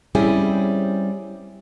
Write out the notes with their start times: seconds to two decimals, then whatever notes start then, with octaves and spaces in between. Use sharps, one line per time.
0.15 G3 C4 C#4 E4 G4 G#4